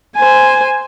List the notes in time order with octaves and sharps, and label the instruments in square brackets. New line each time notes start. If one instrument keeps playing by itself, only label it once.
[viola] C5 G#5